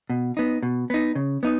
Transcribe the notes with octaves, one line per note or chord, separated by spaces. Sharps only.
B2
B3 D#4
B2
B3 D#4
C#3
B3 D#4